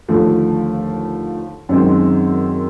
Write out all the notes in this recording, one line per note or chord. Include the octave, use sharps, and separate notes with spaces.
D#2 D3 F3 A3
F#2 D#3 G#3 C4